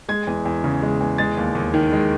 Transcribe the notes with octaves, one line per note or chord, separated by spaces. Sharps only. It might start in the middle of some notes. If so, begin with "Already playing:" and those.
G#3 G#6
E2
E2
C#3
G#3
E2
G#3 A6
D#2
D#2
D#3
G#3